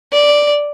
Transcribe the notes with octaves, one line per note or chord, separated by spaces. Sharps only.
D5